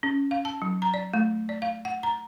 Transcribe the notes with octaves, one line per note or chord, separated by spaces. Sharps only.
C#4
F5
A5
F#3
A#5
D5
A3
D5
F5
F#5
A#5